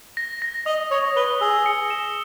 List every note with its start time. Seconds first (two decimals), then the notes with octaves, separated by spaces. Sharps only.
0.17 A#6
0.42 A#6
0.66 D#5 D#6
0.91 C#5 D#6
1.16 B4 G7
1.41 G#4 E6
1.66 C#7
1.90 E7